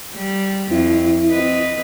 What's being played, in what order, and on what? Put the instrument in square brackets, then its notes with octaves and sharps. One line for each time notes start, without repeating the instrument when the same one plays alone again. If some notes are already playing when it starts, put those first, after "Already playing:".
[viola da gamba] G3
[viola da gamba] F2 [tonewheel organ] E4
[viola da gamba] C4 B4 D#5